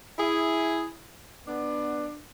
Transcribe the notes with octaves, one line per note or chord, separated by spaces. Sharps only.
E4 G#4
B3 D4